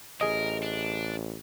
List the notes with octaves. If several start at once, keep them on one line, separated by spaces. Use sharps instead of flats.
A1 G#4 A#4 D#5
D4